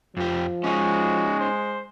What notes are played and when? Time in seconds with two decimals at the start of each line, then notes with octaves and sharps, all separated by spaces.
0.17 F2 F3 G4
0.64 G#3 C#4 D#4 F#4
1.40 C5